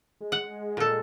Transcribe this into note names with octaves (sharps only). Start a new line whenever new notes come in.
G#3
F#5
A#2 A4